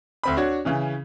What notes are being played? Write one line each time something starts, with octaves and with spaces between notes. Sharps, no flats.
D2 C4 B5
D4 F#4 C#5
C#3 E3 C#4